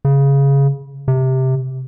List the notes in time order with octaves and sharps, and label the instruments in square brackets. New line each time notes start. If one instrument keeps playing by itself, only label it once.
[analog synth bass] C#3
C3